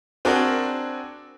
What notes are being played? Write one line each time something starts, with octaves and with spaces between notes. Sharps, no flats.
C4 D4 F#4 G#4 A#4 D5